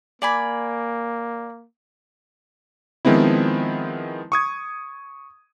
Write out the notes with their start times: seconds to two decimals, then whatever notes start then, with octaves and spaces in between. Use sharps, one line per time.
0.22 A#3 D5 G#5 B5
3.05 D#3 F3 G#3 B3 C4 E4
4.32 C#6 D#6 G#6